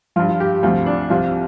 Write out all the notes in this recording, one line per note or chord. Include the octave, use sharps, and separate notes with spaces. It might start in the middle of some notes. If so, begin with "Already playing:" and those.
G2 F3 F4
F4
G4
D2 C3 F3 F4
D4
C2 C3 F3 F4